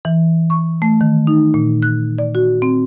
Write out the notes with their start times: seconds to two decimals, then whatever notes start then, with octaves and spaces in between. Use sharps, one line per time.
0.05 E3
0.50 C#6
0.82 A3
1.01 D#3
1.27 D#4
1.54 A#2
1.82 F#6
2.18 D5
2.35 F#4
2.62 C4